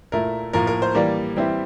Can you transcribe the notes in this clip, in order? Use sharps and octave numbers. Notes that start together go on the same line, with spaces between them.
A#2 A3 E4 A#4
A2 F3 A#3 A#4
A#4
C5
E3 G3 A#3 D5
E3 G3 C4 E4